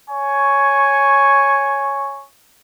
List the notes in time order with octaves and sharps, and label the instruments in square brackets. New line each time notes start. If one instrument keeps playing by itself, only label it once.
[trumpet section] C#5 G#5 C#6